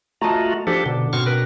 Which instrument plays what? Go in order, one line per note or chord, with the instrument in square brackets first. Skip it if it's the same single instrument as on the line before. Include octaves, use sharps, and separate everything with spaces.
[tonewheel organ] A3 F4 F#4 [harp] D#5 A5 A#5
[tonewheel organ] F3 G4 A4 [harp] D4
[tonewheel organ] B2 D3
[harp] B2 C4 [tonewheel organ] C#6 F6
[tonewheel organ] A#4 [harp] B4